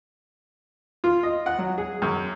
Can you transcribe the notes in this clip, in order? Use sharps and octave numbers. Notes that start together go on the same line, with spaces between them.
F4
D#5
F#5
F#3
G#4
F#2